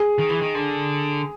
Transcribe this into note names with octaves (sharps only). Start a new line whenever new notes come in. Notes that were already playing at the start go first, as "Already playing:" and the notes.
Already playing: G#4
D#3
E3
D#3
D3